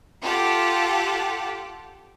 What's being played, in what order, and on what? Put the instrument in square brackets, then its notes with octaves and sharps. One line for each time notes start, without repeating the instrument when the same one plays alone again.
[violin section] F4 G4 A4 F#5